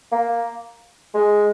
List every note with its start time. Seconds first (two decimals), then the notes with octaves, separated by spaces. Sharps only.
0.12 A#3
1.14 G#3